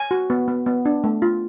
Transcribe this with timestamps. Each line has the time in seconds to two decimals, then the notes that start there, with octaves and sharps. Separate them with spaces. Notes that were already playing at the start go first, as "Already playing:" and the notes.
Already playing: G#5
0.11 F#4
0.30 B3
0.48 B3
0.66 B3
0.85 D4
1.04 A3
1.22 F4